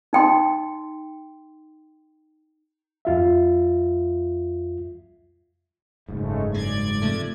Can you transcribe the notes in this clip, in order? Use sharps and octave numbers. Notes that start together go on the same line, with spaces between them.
D#4 G5 C6
F2 F4 E5
F#1 G#2 C#3 G#3 A3
G#3 D5 G#6
C3 F3 A3